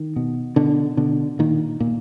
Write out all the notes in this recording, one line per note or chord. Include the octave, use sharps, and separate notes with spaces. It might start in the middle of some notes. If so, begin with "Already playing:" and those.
Already playing: D#3
B2
B2 D3
B2 D3
A#2 D#3
A#2